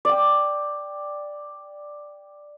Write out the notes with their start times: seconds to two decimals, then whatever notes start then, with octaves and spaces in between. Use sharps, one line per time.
0.05 D5 G5